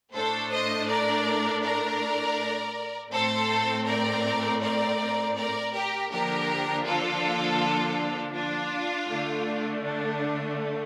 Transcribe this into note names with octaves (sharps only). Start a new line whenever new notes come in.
A2 A3 D4 A4 C5
C5 D#5
A#4 D5
A#4 D5
A2 A3 C4 A4 C5
A#4 D5
A#4 D5
A#4 D5
G4 A#4
D3 F3 A#3 D4 G4 A#4
F4 A4
D4 F4
D3 A3 D4
D4